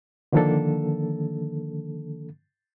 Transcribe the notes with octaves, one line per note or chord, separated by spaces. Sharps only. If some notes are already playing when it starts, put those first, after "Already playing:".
D3 D#3 F3 A#3 D4 A4